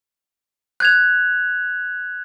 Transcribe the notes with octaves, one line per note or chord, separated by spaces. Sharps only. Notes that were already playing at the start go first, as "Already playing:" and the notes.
F#6 G#6 F7